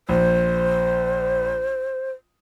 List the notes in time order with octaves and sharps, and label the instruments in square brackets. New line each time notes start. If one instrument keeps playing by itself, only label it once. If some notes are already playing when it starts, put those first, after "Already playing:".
[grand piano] A#1 [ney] C5